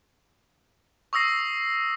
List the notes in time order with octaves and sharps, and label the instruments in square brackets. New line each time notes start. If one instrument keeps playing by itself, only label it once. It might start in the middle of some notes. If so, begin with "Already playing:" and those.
[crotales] C#6 D#6 E6 A#6 C7